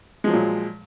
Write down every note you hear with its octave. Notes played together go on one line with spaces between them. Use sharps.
A#2 F3 F#3 G#3